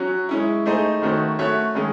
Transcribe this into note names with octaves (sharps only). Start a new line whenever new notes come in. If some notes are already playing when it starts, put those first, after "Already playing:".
Already playing: F#3 C#4 F#4
G#3 C#4 E4
A3 D#4 G#4 C5 D#5
D#3 A3 C#4 F#4 C5
A3 C#4 F#4 C#5 E5
D#3 G#3 C#4 G#4